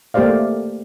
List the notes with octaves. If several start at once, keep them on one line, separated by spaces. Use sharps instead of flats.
A3 A#3 G4 C5 D5 F5